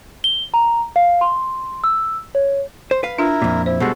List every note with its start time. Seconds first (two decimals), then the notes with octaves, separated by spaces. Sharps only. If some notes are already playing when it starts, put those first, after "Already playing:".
0.24 G7
0.54 A#5
0.96 F5
1.21 C6
1.84 E6
2.35 C#5
2.91 C5
3.03 B4 F5
3.18 D4 E4 F4 A#4
3.42 F2 A#2
3.66 E4 C5
3.80 B2 G3 G#3 F#4 A4